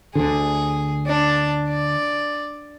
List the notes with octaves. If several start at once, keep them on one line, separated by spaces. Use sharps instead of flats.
D2 D3 G#4
D4 A5
D5